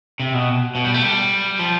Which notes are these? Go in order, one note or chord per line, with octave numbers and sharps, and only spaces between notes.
C3
B2
B2
G3
A3
G3
F3